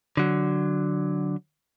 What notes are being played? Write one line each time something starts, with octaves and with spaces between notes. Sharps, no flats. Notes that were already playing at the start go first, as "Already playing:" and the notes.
D3 F#3